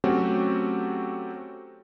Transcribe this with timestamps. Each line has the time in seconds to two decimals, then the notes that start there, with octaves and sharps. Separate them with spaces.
0.04 F#3 A3 C4 C#4 F#4 G4